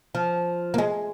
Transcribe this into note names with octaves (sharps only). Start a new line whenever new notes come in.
F3
A#3
G#3